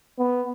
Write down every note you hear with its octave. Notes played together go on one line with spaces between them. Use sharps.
B3